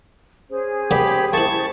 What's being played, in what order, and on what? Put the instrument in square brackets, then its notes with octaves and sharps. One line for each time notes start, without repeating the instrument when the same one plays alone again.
[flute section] C#4 G#4 C5
[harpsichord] A#3 B3 D5 [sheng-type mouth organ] G4 B5
[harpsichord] A#3 E4 [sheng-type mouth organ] A5 C#6